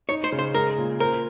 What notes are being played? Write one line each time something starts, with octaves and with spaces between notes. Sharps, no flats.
D#4 C#5
C5
C#3
C5
G#3 A#4
A#2
A#4 C5